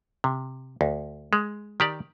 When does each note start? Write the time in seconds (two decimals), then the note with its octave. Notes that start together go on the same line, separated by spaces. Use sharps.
0.24 C3
0.81 D2
1.33 G#3
1.80 D#3 G4 D5